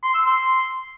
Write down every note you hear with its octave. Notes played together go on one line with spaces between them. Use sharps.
C6
E6
C6